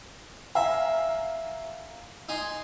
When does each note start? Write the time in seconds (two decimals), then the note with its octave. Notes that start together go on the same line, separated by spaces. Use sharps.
0.55 E5 F5 G#5 A#5
2.29 D#4 G#5 C6